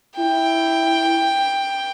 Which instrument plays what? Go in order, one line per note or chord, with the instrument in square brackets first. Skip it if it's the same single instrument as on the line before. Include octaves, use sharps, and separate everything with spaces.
[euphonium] E4 [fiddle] G5